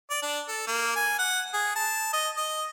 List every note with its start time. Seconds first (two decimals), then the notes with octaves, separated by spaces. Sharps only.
0.10 D5
0.23 D4
0.48 A4
0.67 A#3
0.96 G#5
1.19 F#5
1.54 G#4
1.76 A5
2.13 D#5
2.37 D#5